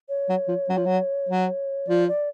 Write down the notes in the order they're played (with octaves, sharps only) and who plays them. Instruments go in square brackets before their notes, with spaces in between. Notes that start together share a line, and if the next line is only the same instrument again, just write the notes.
[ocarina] C#5
[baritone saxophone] F#3
F3
F#3
F3
F#3
F#3
[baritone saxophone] F3 [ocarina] D5
[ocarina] D5